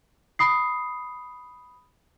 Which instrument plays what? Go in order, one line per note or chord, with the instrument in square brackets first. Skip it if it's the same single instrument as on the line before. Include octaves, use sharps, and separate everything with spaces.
[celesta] B5 D#6 C7